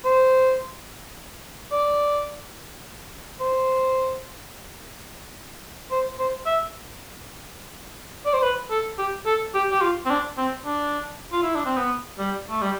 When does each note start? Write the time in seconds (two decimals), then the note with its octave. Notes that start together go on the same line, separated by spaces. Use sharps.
0.05 C5
1.72 D5
3.40 C5
5.91 C5
6.18 C5
6.46 E5
8.26 D5
8.34 C5
8.42 B4
8.71 A4
8.99 G4
9.26 A4
9.54 G4
9.71 G4
9.81 F4
10.06 C4
10.10 D4
10.37 C4
10.66 D4
11.32 F4
11.43 E4
11.55 D4
11.66 C4
11.77 B3
12.19 G3
12.50 A3
12.62 G3